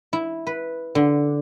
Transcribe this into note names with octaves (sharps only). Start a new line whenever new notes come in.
E4
B4
D3